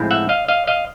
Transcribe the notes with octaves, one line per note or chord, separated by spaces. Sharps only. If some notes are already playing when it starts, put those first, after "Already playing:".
Already playing: A2 F3 G#3 C4 E4
E5 F#5
D#5 F5
D#5 F5
D#5 F5